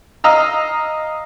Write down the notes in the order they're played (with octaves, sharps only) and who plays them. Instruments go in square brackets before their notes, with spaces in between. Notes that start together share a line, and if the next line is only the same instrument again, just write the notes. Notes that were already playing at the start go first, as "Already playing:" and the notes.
[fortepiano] D#5 F5 A#5 E6